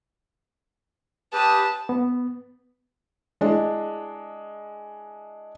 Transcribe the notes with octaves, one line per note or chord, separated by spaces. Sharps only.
G4 B4 A5 D#6
B3
G#3 D4 E4